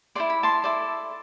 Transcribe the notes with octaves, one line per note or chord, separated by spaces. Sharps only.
E4 A4 D5 C6
B5
A5 C6
E4 A4 D5